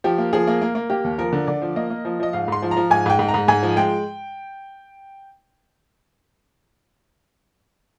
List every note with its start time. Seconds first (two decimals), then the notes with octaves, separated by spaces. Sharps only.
0.04 F3 G4
0.18 A#3
0.33 F3 G#4
0.47 A#3
0.61 A#3
0.75 A#3
0.90 A#3 G4
1.04 D#2
1.18 F3 A#4
1.33 D3
1.47 D3 D5
1.62 F3
1.76 A#3 D#5
1.90 A#3
2.05 F3
2.20 F3 D#5
2.33 G#2 F5
2.48 G#2 C6
2.62 F3
2.71 A#5
2.77 F3
2.90 G#2 G#5
3.06 G#2 G5
3.19 G#2
3.28 A#5
3.34 G#2
3.48 G#2 G#5
3.63 F3
3.76 G#3 G5